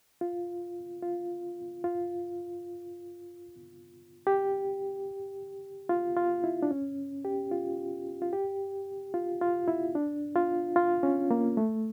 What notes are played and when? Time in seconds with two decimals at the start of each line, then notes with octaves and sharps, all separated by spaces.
0.21 F4
1.02 F4
1.84 F4
4.27 G4
5.89 F4
6.16 F4
6.44 E4
6.63 D4
6.71 C#4
7.25 G4
7.51 F4
8.22 F4
8.33 G4
9.14 F4
9.41 F4
9.68 E4
9.95 D4
10.35 F4
10.76 F4
11.03 C#4
11.31 A#3
11.57 A3